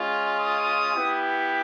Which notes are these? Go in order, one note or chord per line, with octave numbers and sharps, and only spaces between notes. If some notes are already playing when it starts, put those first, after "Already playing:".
Already playing: G#3 C#4 F4
D#6
B3 E4 G4